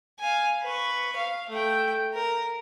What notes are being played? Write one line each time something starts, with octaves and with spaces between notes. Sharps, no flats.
F5 G#5
B4 C#6
F5
A3 G5
A#4